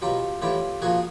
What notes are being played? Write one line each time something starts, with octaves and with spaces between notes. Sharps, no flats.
B2 F#3 F4 G4
A2 E3 G3 F4 G4
A#2 F3 F#4 G#4